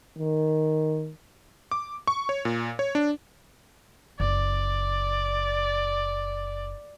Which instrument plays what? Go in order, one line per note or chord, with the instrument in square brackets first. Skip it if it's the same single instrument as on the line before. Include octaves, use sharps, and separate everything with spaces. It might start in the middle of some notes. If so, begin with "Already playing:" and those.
[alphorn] D#3
[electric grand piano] D6
C#6
C#5
A#2
C#5
D4
[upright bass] F#1 [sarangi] D5